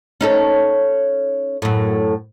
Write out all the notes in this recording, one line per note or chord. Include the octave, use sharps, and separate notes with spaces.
C#4 D#4 A4
F#2 A2